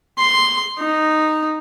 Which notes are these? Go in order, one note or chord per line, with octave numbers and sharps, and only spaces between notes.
C6
D#4